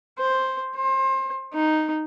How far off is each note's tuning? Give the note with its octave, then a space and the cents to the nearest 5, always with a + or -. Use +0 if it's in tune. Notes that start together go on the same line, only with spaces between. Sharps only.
C5 +5
C5 +30
D#4 -5